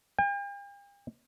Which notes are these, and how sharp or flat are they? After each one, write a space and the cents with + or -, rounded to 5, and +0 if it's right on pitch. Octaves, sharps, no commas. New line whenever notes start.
G5 +45